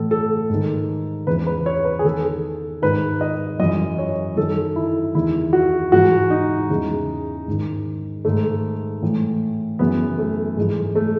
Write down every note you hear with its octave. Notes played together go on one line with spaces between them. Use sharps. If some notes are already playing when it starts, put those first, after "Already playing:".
Already playing: A2 E3 A4
A4
G#2 D#3
E2 C#3 E3 B4
B4
C#5
B4
G#4
E2 D#3 A4
G#2 D#3 B4
D#5
F#2 E3 D#5
C#5
F#2 D#3 A4
E4
E2 D#3 E4
F#4
G#2 E3 F#4
D#4
E2 C#3 E3
G#2 D#3
G#2 D#3 A3
A2 E3
F#2 C#3 E3 B3
A3
G#2 E3 G#3
A3